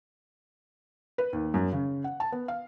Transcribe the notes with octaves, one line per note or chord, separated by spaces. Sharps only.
B4
D#2
F#2
C#3
F#5
A5
B3
F5